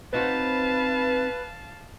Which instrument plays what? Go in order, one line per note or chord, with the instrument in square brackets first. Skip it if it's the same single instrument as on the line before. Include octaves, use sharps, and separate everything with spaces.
[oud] C4 D#4 F#4 [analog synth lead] B4 [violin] F5 A5